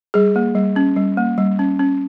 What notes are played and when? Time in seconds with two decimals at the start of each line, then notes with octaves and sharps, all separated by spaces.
0.14 G3 G#4
0.36 A#3
0.55 G3
0.76 C#4
0.96 G3
1.17 A#3
1.38 G3
1.59 C#4
1.79 C#4